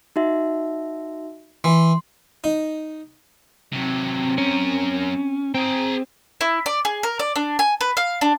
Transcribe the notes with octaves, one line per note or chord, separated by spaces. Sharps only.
D#4 F#4 E5
E3 C6
D#4
C3 F#3 C4
F#2 C#4 A#4
C4 G#4 G5 A#5
E4
D5
G#4
A#4
D5
D4
G#5
B4
F5
D4